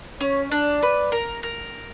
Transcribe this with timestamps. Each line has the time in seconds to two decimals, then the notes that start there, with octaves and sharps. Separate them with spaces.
0.21 C#4 C#5
0.51 D4 D5
0.82 B4
1.12 A#4
1.43 A#4